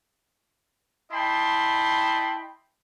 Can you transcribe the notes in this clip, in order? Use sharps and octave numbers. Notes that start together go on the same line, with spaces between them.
E4 D#5 G5 A5 B5 C6